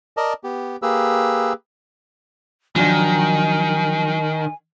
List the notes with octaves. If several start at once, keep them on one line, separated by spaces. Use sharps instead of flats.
A#4 D5 D#5 A5
B3 G4
A#3 G4 G#4 B4 E6
D#3 F3 F#3 D4 G#5